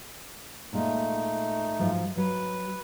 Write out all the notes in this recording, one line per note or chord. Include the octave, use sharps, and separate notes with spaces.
A#2 G#3 A3 D#4
G#2 F3 F#3
F#3 B4